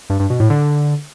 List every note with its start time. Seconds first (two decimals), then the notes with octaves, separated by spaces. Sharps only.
0.10 G2
0.20 G2
0.30 B2
0.40 A2
0.50 D3